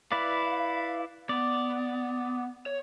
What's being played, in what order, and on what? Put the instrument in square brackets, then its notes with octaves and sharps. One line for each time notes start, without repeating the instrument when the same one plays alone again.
[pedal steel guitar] E4 B4 D5 [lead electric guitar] F5
[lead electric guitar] B3 [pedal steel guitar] D5
[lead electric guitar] C#5